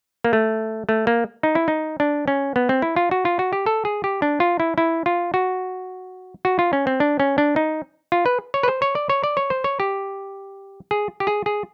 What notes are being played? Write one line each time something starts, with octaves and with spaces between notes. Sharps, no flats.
A#3
A3
A3
A#3
D#4
E4
D#4
D4
C#4
B3
C4
E4
F4
F#4
F4
F#4
G4
A4
G#4
G4
D4
F4
E4
E4
F4
F#4
F#4
F4
C#4
C4
D4
C#4
D4
D#4
F4
B4
C#5
B4
C5
C#5
D5
C#5
D5
C#5
C5
C#5
G4
G#4
G4
G#4
G#4